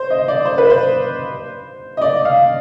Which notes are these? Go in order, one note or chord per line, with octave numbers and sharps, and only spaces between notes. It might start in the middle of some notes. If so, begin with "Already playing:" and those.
Already playing: C5
D#5
D5
C5
B4
C5
D#5
D5
F5